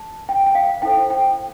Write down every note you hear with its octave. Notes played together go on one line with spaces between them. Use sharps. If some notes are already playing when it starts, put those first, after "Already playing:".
Already playing: A5
G5
G5
F5
E4 A4 C5 G5
G5